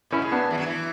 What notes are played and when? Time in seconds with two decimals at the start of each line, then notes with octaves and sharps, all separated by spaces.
0.11 B2 C#4 E4
0.22 C#3
0.32 B3 D4
0.50 E3
0.58 F#3
0.66 E3